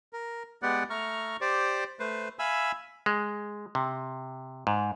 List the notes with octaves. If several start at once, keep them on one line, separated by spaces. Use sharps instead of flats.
A#4
G#3 B3 G4 B4 D5 F#5
A3 A#5 C#6 F6
G4 C5 D5
A3 B4 C5
E5 F5 G#5 B5 E6
G#3
C3
G#2